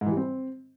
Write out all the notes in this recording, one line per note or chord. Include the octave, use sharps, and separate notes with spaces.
G#2
E3
G3
C4